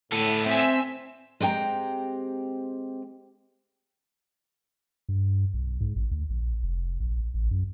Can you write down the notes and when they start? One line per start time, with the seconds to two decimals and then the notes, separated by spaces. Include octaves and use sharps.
0.12 A2 D3 B3 A4
0.46 C4 E5 G#5 E6
1.40 G#3 C4 G4 G5 A#5
5.09 G2
5.54 B1
5.80 G#2
5.96 A1
6.11 D2
6.30 A#1
6.63 F1
7.00 A#1
7.34 A1
7.51 F#2